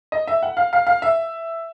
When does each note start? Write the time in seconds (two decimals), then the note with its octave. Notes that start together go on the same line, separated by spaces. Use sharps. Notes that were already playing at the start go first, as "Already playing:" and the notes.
0.12 D#5
0.27 E5
0.42 F#5
0.57 F5
0.73 F5
0.87 F5
1.02 E5